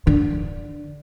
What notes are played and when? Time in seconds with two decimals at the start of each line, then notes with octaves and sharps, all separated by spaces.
0.07 D3